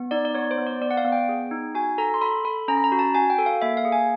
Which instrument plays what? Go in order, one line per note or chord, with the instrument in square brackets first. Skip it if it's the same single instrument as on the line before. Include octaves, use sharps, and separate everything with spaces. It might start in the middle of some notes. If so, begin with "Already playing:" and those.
Already playing: [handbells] B3
D#4 D5
D5
B3 C#5
C5
B3
D5
B3 D5
F#5
F5
B3
G5
G#4
D#4
F#4 G#5
A4 A#5
C6
A4 B5
A4 B5
C#4 A#5
B5
A#5
F#4
A5
F#4 G#5
G5
A4
F5
A#3 E5
F5
G#4
G#5